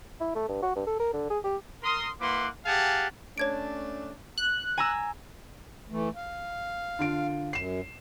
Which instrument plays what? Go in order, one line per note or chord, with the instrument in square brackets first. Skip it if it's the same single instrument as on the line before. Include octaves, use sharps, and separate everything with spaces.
[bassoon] E4
A3
G2
F#4
G2
A4
A#4
D3
G#4
G4
[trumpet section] A#4 C6 D#6
A#3 E4 B4 F#5 C6 D6
G4 G#4 F5 F#5 G#5 A5
[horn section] A3 C#4 D4 [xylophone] C#5 G#6 D7
[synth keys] F#6
[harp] G#5 A#5 E6
[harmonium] E3 A3
F5
[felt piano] D3 F4 D7
[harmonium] F#2 [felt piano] C7 E7